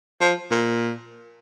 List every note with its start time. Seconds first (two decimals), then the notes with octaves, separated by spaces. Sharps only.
0.20 F3
0.51 A#2